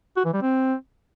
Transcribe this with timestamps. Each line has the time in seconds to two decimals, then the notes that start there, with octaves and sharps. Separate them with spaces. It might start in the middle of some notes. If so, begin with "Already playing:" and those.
0.17 F#4
0.25 E3
0.33 G3
0.42 C4